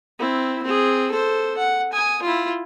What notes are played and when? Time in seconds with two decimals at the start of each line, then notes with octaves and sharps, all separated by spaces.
0.19 C4 E4
0.63 C4 G#4
1.11 A4 C5
1.57 F#5
1.93 G#5 D#6
2.22 E4 F4